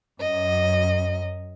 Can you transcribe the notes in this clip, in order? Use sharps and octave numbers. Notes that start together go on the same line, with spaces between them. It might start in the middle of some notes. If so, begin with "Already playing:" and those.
F#2 D#5